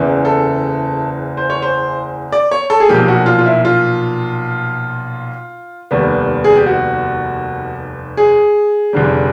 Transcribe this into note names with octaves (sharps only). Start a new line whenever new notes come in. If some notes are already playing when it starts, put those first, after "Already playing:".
Already playing: F#1 E2 C#3 E3
A4
C5
C#5
C5
D5
C#5
A4
G#4
B1 A#2 F3 A#3 G4
F#4
F4
F4
E4
F4
F1 D#2 D#3 G3 B3
G#4
G4
F#4
G#4
F1 F2 D3 G3